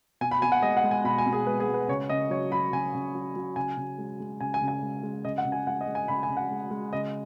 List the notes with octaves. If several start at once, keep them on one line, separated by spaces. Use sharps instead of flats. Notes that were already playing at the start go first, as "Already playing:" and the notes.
B2 G#5
B5
B2 G#5
F#5
G#3 D#5
F#5
G#3
G#5
B2 B5
G#5
B2
G#4
G#3 B4
G#4
G#3
B4
C#3 C#5
C#3 D#5
F#3 C#5
F#3 B5
C#3 G#5
C#3
F#3
F#3
C#3 G#5
C#3
G#3
G#3
C#3 G#5
G#5
C#3
G#5
G#3
G#3
C#3 D#5
F#5
C#3
G#5
G#3 F#5
D#5
G#3
G#5
C#3 B5
G#5
C#3
F#5
G#3
G#3
C#3 D#5